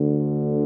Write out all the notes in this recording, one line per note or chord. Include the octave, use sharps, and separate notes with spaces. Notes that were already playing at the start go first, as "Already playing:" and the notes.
Already playing: D2 D3